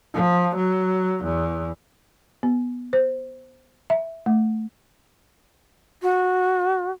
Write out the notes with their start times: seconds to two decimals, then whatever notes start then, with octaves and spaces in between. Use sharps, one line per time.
0.14 F3
0.56 F#3
1.24 E2
2.43 B3
2.93 C5
3.90 E5
4.26 A3
6.02 F#4